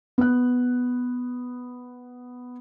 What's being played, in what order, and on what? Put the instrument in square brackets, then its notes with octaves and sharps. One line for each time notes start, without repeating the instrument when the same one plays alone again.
[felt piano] B3 F#6